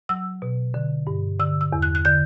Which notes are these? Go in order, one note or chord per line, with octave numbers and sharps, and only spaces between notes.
F#3 E6
B2
D3
G2
D3 E6
E6
E2
F#6
F#6
D3 G6